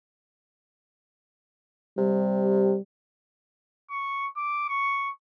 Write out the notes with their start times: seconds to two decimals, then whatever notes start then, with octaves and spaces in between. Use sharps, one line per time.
1.98 C3 G3
3.91 C#6
4.37 D6
4.69 C#6